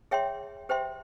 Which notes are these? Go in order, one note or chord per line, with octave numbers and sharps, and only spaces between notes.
G#4 C#5 E5 G5 C6
G4 C5 E5 G5 C6